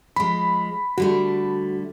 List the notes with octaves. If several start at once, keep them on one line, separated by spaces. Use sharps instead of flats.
F3 G#3 B5
D3 G3 A3 F#4